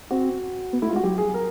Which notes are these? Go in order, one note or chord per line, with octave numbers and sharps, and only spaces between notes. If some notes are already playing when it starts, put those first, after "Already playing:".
C4 F#4
B3
A3 E4
F4
G#3
F#4
F#3 G4
G#4
A#4